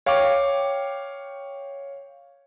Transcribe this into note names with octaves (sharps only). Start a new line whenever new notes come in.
C#5 F5 G5 C#6 D6